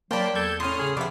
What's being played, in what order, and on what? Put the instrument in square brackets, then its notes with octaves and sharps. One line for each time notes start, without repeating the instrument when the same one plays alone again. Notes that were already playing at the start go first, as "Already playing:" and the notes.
[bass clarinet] F#3 [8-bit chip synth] A#3 A5 B5 [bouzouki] C5 D5 [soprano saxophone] G5
[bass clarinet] E2 [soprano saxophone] A4 [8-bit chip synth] G6 G#6
[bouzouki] A2 C#4 [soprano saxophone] C6 [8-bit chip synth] D#6 F6
[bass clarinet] C#3 [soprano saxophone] G#4
[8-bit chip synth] C3 [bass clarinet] F3 [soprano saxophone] B3 [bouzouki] D5 E5